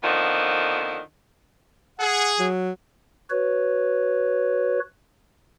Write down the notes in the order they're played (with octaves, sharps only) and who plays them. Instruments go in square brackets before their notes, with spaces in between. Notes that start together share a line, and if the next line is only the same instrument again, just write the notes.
[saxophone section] F2 D3 D#3 F3 B3
[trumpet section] G#4 [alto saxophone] F#5
[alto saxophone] F#3
[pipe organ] F#4 B4 C#5